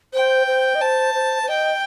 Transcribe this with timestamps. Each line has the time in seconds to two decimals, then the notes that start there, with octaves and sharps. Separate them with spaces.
0.13 C5 G5
0.47 C5
0.75 D#5
0.81 C5 A5
1.15 C5
1.43 C5
1.49 D#5 G5